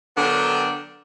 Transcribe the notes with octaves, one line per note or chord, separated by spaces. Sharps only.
D3 F#3 B3 D4 A#4 G5